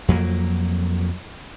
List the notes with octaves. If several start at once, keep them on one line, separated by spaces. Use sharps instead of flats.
F2 F#3 A#3